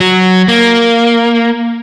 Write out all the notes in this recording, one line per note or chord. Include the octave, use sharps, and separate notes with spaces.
F#3
A#3